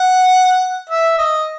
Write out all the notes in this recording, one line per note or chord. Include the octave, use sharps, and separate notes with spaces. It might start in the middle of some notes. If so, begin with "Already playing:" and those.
Already playing: F#5
E5
D#5